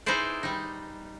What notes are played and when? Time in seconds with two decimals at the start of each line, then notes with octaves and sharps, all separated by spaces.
0.06 D#4 E4 G#4 B4 C5 D5
0.43 G3 D#4